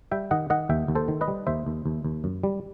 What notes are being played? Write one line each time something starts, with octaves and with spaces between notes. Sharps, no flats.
G3 E5 G5
D#3 D#5 F#5
D#3 D#5 F#5
D#2 E5 G5
D#2
A4 C5
D#3
B4 D#5
G3
D#2 C5 E5
D#2
D#2
D#2
F#2
G3